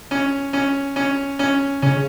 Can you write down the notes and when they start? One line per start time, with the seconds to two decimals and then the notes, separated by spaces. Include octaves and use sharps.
0.11 C#4
0.53 C#4
0.96 C#4
1.39 C#4
1.82 C#3 C#4